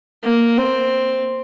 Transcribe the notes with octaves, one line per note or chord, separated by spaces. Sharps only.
A#3
C4